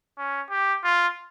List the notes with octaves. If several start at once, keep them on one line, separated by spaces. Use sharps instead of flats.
C#4
G4
F4